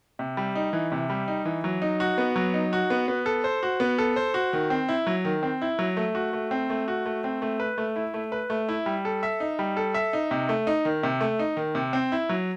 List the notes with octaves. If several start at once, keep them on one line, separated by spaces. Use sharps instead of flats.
C3
G3
D#4
E3
C3
G3
D#4
E3
F#3
D#4
F#4
B3
F#3
D#4
F#4
B3
B3
A4
C5
F#4
B3
A4
C5
F#4
D#3
C4
E4
F#3
D#3
C4
E4
F#3
A3
F#4
A3
C4
A3
F#4
A3
C4
A3
B4
A3
E4
A3
B4
A3
E4
G3
A4
E5
D#4
G3
A4
E5
D#4
C3
A3
D#4
D#3
C3
A3
D#4
D#3
C3
C4
E4
F#3